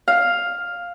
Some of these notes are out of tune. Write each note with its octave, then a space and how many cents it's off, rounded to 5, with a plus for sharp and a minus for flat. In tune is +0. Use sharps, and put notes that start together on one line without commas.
F5 +5